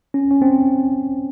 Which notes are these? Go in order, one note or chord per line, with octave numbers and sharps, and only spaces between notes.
C#4
C#4
C4